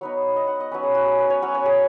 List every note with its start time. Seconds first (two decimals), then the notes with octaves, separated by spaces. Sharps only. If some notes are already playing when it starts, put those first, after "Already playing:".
0.01 F#3 B3 D#4 C#5
0.36 D#5
0.47 F#5
0.60 D#5
0.72 F#3 C#4 B4
0.83 G#4
0.95 F#4
1.06 G#4
1.19 B4
1.30 C#5
1.42 F#3 C#4 F#5
1.54 C#5
1.66 G#4